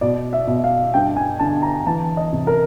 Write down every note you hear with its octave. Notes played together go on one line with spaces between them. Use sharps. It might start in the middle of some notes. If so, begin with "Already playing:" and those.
B2 D5
E5
B2
F5
G2 G5
G#5
D3 A5
A#5
E3 A5
D#5
C3
A#4